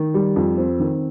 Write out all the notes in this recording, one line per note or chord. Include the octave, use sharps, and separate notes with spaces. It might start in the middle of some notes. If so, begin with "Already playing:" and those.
Already playing: D#3
G3
F2
C4
D#3